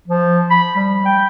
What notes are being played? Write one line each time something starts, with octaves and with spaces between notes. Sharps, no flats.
F3
B5
G3
G5